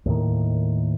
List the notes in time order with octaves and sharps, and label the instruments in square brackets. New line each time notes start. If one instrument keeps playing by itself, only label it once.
[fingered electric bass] D#2 A2 D#3